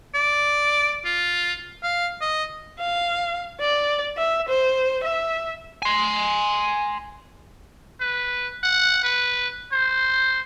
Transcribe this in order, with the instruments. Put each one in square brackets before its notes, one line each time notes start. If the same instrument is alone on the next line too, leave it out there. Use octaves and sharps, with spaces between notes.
[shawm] D5
F4
F5
D#5
[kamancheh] F5
D5
E5
C5
E5
[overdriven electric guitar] G#5 C6
[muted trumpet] B4
F#5
B4
C5